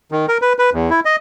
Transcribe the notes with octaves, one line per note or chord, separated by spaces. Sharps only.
D#3
A#4
B4
B4
E2
E4
D#5